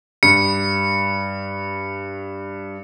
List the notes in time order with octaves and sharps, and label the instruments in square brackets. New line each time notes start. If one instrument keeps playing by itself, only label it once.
[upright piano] G2 [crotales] C#7